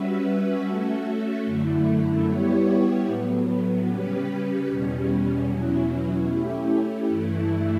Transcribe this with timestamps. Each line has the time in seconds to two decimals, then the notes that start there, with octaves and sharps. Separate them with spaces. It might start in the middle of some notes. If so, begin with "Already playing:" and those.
Already playing: G3 C#4 F#4 B4 E5
0.65 A3 C#4 F#4 A4 E5
1.45 F#2 D3 A3 E4
2.26 G3 B3 E4 G4 C#5
3.06 A2 F#3 B3
3.86 C#3 G3 C#4 G4 B4
4.67 E2 B2 G3 C#4
5.47 E2 B2 F#3 C#4 E4
6.28 A3 C#4 E4 G4
7.08 G2 E3 A3 E4